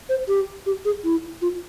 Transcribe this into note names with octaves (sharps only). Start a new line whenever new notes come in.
C5
G4
G4
G#4
E4
F4